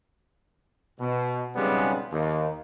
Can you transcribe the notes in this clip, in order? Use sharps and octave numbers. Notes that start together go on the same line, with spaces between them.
B2
B1 F2 C#3 G3 G#3 B3
D#2